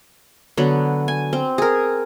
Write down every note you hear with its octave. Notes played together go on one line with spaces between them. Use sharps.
D3 F#3 B3
G#5
C4
G#4 A#4